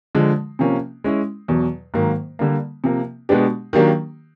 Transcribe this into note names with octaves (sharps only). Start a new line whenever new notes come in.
D3 F3 G#3
C3 F3 A#3 C#4
G#3 C#4 E4
E2 B2 F#3
G#2 D#3 F#3 A#3
D3 G3 A#3
C3 F3 A#3
B2 G#3 B3 D4 G4
D#3 F#3 A#3 D4 G4